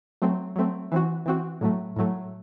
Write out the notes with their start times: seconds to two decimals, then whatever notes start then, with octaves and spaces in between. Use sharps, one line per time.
0.22 F#3 A3 C4
0.56 F#3 A3 C4
0.92 E3 C4 F#4
1.26 E3 C4 F#4
1.61 A2 F#3 A3
1.96 A2 F#3 A3